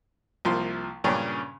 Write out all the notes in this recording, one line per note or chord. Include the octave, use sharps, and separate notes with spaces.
C2 F3 A#3 C6
G2 A#2 C#3 C#4 D4